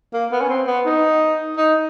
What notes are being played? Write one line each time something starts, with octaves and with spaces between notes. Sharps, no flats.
A#3
B3
C#4
C4
B3
D#4
D#4